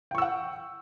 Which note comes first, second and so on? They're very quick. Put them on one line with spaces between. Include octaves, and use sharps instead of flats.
G5 C#6 E6 F#5